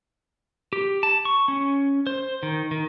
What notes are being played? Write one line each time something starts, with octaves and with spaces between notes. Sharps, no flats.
G4
A5
C#6
C#4
C5
D#3
D#3